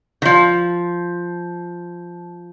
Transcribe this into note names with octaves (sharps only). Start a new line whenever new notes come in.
D#3
F3